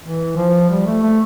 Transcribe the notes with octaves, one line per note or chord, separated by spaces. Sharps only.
E3
F3
G3
A3
A3